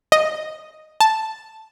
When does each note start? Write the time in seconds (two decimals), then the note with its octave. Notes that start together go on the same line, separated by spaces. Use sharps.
0.12 D#5
1.00 A5